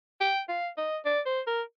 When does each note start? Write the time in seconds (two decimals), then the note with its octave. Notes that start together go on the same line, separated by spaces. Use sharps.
0.21 G5
0.49 F5
0.77 D#5
1.05 D5
1.26 C5
1.47 A#4